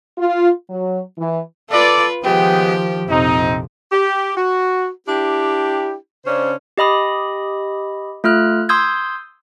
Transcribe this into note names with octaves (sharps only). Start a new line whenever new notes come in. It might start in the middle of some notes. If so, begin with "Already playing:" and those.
F4
F#3
E3
F4 A4 B4 D5
D#3 F3 G#3 B3 G4 G5
A#1 F2 C3 C4 D#4
G4
F#4
D4 E4 G4
C#3 C#4 D4 C5
G4 D#5 B5 D#6
A3 F4 F6 F#6
C6 D#6 E6 G6 G#6